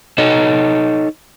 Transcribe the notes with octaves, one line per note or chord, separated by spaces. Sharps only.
D#4 A4 C#5 D#5